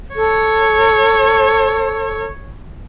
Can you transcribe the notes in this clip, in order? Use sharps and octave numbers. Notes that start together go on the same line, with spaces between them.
A4 C#5